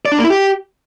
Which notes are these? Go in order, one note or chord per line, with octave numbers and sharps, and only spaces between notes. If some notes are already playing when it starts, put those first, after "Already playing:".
D5
D4
A#3
E4
G4